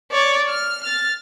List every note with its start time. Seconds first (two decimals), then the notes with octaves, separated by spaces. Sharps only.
0.12 C#5 D5
0.49 F6
0.83 F6 A6